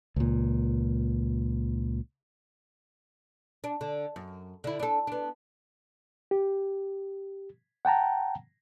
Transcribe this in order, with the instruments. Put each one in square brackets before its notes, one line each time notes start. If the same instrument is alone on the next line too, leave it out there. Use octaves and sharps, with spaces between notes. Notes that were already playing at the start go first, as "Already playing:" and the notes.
[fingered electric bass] C#2 A#2
[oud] D4
D3
F#2
D3 E4
D4 A4
B3 D4
[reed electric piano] G4
F#5 G5 A5 A#5